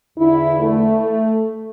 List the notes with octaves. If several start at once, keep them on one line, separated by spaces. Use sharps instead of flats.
E2 D3 E4
A3